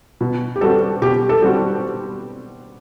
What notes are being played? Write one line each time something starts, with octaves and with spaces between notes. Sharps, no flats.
B2
G4
G3 C4 F#4 A4
B2 G4
A4
G3 C4 F#4